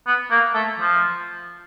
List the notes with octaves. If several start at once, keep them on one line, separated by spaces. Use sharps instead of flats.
B3
A#3
A3
F3